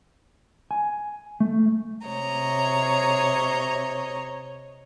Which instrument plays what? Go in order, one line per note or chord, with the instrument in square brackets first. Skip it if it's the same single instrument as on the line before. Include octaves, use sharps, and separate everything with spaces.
[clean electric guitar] G#5
A3
[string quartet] C3 C#5 D#5 A#5